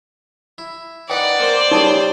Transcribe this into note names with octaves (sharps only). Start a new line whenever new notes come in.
E4
D#4 B4 D5 F#5 G5
A#3 C5
C#3 G3 D#4 G#4 A5